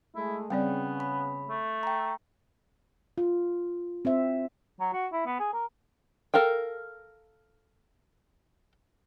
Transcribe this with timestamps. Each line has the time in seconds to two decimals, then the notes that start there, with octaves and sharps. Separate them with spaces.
0.15 G#3 A3 E4
0.50 C#3 G3 B3 C4 D5 G5
1.00 B5
1.48 A3
1.83 G5 A#5
3.18 F4
4.05 C4 C5 E5
4.80 F#3
4.93 F#4
5.12 E4
5.26 B3
5.40 G#4
5.53 A#4
6.34 A4 A#4 F5 G5